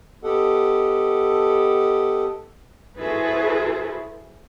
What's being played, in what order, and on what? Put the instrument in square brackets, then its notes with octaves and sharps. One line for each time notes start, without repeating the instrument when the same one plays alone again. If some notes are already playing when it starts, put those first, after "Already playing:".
[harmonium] B3 G4 A4 D#5 F#5
[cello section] E4 F#4 G#4 A4 B4 C5